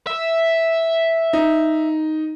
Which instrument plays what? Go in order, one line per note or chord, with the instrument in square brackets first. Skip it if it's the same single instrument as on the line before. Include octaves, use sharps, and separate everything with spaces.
[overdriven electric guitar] E5
[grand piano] D#4